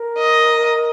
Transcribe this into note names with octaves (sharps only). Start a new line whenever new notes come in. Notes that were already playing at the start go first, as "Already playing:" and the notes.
Already playing: A#4
D#5